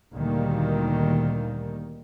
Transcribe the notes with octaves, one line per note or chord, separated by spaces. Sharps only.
D2 A#2 D#3 G3 A#3